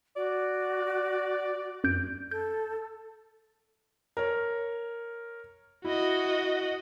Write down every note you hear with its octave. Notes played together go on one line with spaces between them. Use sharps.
F#4 D5
F#2 G6 D7
A4 G6
A#4 C#5
E4 F#4 D#5